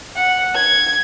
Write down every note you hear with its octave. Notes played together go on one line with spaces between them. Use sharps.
F#5
G#6